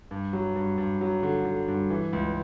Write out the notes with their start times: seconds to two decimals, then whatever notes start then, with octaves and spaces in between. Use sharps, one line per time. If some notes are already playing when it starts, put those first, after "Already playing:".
0.11 G2
0.33 F#3
0.56 G2
0.78 G2
1.01 F#3
1.23 D3
1.45 D3
1.68 G2
1.90 E3
2.13 C#2